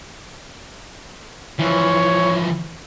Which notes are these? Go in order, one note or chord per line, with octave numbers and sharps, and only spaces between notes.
E3 F3 C#5